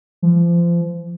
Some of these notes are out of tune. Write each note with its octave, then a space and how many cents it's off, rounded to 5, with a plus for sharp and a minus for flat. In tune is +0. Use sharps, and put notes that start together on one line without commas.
F3 -30